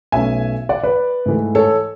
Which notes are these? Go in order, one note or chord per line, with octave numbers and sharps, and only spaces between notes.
B1 B2 A3 C#4 E5 G#5
D5 F#5
B4 D5
G#2 E3 A3
A4 C#5